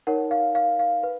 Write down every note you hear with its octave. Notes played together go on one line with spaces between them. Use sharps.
D#4 A#4 C#5 F#5
F5
F5
F5
B4